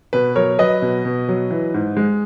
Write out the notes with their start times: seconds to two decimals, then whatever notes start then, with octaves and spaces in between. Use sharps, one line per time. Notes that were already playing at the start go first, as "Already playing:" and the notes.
0.13 B2 B4
0.35 F#3 A#4 C#5
0.59 F#3 B4 D#5
0.82 B2
1.05 B2
1.28 F#3
1.51 E3
1.74 G#2
1.97 G#3